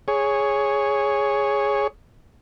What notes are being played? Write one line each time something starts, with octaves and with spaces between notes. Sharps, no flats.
G#4 C#5